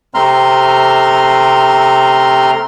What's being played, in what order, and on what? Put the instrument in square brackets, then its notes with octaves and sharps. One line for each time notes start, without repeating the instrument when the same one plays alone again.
[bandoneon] C3 A3 C4 A#5 C6 F6